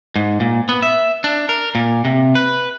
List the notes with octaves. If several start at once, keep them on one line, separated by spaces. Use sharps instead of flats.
G#2
A#2
B3
E5
D4
A#4
A#2
C3
B4